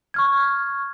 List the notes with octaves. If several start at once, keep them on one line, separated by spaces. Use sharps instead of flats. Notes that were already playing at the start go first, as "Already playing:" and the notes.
C#6 F6 G#6